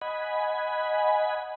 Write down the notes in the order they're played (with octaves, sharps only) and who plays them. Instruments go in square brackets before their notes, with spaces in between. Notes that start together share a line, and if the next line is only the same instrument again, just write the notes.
[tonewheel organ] D#5 F#5 G#5 B5